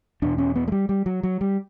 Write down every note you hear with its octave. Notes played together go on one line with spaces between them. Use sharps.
E2 B2 D4
C#4
B3
A3
G3
G3
F#3
F#3
G3